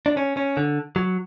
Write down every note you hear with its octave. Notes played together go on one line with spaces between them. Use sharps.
D4
C#4
C#4
D3
F#3